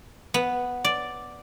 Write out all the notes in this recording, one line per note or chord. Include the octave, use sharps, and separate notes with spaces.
B3
D5